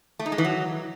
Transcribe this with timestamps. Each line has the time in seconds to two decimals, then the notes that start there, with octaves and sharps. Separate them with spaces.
0.19 A3
0.26 D#4
0.32 G#3
0.38 E3
0.45 F#3